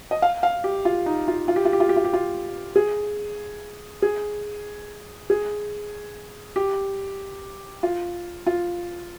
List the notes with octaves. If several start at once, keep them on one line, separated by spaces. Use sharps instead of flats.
D#5
F5
F5
G4
F4
D#4
F4
F4
G4
F4
G4
F4
G4
F4
G4
F4
G#4
G#4
G#4
G4
F4
F4